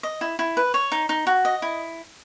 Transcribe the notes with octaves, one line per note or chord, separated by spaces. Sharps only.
D#5
E4
E4
B4
C#5
D#4
D#4
F#4
D#5
E4